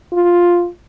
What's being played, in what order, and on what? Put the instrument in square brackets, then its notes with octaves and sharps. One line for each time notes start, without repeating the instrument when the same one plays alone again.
[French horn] F4